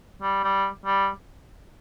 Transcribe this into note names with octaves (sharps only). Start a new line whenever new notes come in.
G3
G3
G3